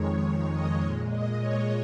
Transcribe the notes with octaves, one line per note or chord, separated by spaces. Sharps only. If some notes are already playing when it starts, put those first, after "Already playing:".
Already playing: F2 D#3 G#3 C#5
C#5
D#5
A#2 G#3
D#5
C#5